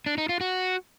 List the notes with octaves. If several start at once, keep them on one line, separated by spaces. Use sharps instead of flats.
D4
D#4
F4
F#4